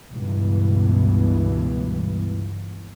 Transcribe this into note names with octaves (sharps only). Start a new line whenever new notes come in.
C#2 G2 B2 E3